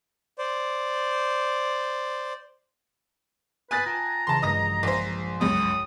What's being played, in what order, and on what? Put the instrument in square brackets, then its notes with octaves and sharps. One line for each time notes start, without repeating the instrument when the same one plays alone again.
[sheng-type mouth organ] C5 D5
[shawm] B4 [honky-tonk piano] G#5 F#6 A6 [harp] D#6
[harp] F4 G5 A5 [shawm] A#5
[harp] A#1 C#3 E3 [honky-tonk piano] A5 C6
[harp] G2 F#3 G#3 [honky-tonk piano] D#5 D#6 A#6
[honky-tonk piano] A#1 C5
[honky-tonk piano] C#2 F#2 [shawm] D#6